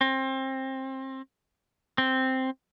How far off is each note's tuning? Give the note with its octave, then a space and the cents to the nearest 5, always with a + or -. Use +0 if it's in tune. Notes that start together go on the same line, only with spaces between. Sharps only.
C4 +25
C4 +0